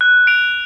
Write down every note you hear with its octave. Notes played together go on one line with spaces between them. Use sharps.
F#6
D7 F7